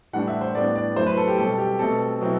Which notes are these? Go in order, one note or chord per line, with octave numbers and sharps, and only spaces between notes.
A2 E3 G3 D4 F#5
E5
C5
A2 G3 B3 D4 D5
D5
F#3 A3 E4 C5
B4
A4
G4
B2 G3 C4 A4
G4
B2 A3 C4 A4
B2 F#3 C4 E4